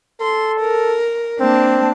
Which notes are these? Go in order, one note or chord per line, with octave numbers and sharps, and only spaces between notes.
A4 C6
A#4
A#3 C4 D4 A5